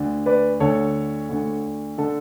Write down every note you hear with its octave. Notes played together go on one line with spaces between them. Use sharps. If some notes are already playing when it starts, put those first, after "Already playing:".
Already playing: D2 D3
B4 D5
D2 D3 A4 C#5
D2 D3
D3 A4